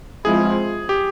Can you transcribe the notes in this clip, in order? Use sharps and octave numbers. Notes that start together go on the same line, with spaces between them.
F3 G#3 C4 E4 G#4
G4